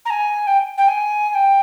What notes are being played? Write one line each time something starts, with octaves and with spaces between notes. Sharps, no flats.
A#5
G#5
G5
G5
G#5
G#5
G5